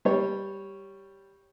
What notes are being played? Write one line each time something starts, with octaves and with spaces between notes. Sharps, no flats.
G3 C#5